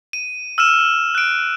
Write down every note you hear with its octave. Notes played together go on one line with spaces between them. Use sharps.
D#7
E6 F6 D#7 E7
F#6 D7